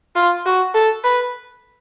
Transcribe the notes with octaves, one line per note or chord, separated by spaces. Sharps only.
F4
F#4
A4
B4